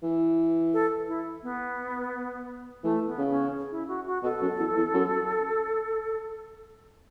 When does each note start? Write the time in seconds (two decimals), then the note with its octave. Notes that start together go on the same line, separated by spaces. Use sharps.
0.03 E3
0.73 A4
1.08 E4
1.43 B3
2.83 E3 A3
3.07 B3
3.18 C#3
3.30 C#4
3.71 E4
3.88 F#4
4.06 F#4
4.23 B2 A4
4.41 F#2
4.59 E2
4.76 E2
4.93 F#2